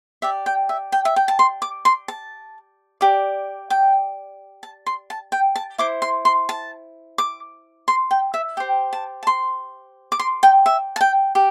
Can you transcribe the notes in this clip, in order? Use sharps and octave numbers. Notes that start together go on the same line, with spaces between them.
G4 D5 E5
G5
E5
G5
E5
G5
A5
C6
D6
C6
A5
G4 D5
G5
A5
C6
A5
G5
A5
E4 C5 D6
C6
C6
A5
D6
C6
G5
E5
G4 C5 G5
A5
A5
C6
D6
C6
G5
E5
A5
G5
G4